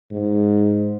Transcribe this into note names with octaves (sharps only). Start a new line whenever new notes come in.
G#2